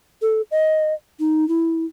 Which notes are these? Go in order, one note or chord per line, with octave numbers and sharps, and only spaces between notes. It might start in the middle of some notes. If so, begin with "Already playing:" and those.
A4
D#5
D#4
E4